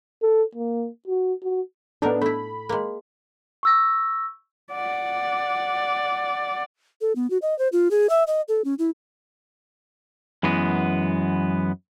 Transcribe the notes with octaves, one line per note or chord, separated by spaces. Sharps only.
A4
A#3
F#4
F#4
A2 B3 D4 D#4 A#4
A3 E4 B5
G#3 A#3
C#6 E6 A#6
D5 F#5
A4
B3
F#4
D#5
C5
F4
G#4
E5
D#5
A4
C#4
E4
F#2 E3 G#3 B3